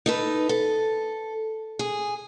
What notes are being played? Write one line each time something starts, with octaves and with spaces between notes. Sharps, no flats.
D#4 A4 B4
A4
G#4